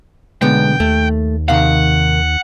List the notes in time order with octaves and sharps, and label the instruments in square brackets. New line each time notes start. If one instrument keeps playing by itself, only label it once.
[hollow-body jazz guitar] B1 D3 B3 [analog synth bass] G#3 [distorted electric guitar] G5
[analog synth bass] D#2 [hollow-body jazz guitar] A3
[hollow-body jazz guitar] C3 D#3 F5 [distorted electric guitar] F#5